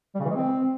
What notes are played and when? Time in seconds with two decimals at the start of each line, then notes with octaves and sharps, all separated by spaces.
0.15 G3
0.20 C#3
0.25 E3
0.30 G#3
0.35 C4